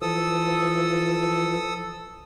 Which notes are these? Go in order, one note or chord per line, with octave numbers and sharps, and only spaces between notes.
E3 F3 A4 D#6 E6